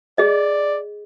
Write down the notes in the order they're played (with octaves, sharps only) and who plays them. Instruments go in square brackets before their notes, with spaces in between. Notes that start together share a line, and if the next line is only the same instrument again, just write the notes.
[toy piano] G#4 D#5 [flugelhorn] D5